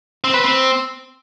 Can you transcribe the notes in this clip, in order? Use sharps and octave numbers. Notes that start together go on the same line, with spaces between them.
C4
B4
C4